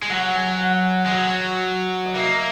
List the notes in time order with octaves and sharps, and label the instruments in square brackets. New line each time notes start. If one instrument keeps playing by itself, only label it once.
[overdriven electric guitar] G#3
[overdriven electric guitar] F#3 [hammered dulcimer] F#5
[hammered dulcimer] G#5
F#5
[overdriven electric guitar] G#3
F#3
[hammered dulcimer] D#5
[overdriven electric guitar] A#3 [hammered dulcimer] E5